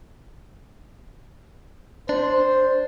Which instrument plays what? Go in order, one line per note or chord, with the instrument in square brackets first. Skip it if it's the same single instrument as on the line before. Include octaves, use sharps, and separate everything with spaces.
[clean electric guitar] D4 [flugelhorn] C5